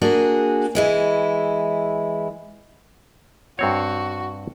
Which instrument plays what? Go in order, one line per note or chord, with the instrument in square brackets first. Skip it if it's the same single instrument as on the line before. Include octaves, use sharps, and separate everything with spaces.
[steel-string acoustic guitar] A#3 D4 F#4 G#4
E3 G#3 E4
[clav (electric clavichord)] G2 C4 C#5 [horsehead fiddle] F#4